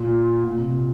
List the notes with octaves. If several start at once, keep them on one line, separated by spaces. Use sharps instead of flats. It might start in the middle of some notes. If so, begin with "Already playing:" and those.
Already playing: A#2
A#2
C3